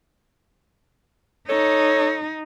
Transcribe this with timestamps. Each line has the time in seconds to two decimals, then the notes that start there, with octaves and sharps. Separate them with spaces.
1.49 D#4 A4 C#5